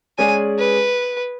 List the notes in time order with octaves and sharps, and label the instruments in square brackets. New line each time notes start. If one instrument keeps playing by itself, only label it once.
[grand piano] G#3 C#4 G#4 D5 [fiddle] G#5
[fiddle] B4